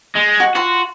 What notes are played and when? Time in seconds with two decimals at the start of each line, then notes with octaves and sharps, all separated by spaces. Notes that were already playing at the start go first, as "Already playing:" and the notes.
0.15 G#3
0.40 F#4
0.55 F4 F#4 C6